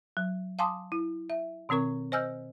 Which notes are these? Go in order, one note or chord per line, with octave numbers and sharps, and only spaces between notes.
F#3
F5 G#5 A5 C6 D6 D#6
E4
E5
B2 D#3 C4 A#4 C#6
C5 D#5 G#5 E6 F6 G6